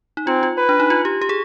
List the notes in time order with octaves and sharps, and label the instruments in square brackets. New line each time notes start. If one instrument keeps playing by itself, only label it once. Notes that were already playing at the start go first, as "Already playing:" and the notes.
[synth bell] D#4
[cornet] C4 [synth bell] F4
[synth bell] F4
[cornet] B4
[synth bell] D4
D#4
F4
G4
G4
G#4